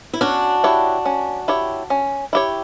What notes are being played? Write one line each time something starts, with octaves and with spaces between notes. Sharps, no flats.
E4
C#4 D4 F#4
E4 G4 C#5
C#4
E4 G4 C#5
C#4
E4 G4 C#5